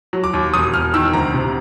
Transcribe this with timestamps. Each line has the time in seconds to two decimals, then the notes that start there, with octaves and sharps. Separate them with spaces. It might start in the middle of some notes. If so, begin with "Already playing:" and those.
0.13 F#3
0.24 D6
0.34 D#2
0.54 E1 D#6
0.74 E1 F6
0.94 D#3 E6
1.13 D2 A#5
1.34 C3